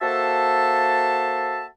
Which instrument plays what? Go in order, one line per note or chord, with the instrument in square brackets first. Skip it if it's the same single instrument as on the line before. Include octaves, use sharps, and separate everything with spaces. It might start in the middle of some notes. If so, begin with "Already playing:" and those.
[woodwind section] A#3 F#4 A4 C5 E5 A5